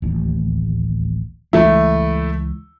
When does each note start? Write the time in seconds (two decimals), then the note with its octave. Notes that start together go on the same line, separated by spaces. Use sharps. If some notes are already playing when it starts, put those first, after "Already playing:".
0.02 D1 A1 D#2
1.53 C#2 E3 G#3 A3 E4